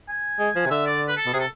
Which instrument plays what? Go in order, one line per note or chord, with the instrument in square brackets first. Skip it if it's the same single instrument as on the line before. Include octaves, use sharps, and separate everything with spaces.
[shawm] G#5
[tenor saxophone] G#3
F3
C3
[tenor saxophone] D3 [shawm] E5
[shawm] D5
B4
A4
[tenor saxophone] B2
[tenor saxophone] C3 [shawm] G#4
[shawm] A4